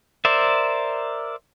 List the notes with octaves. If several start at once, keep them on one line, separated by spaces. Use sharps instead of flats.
A#4 C5 D5 E5